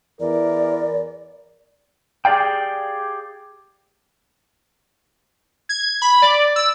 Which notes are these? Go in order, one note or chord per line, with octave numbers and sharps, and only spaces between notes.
E2 E3 A#4 D5
G4 G#4 D5 F5 G5
G#6
B5
D5
E6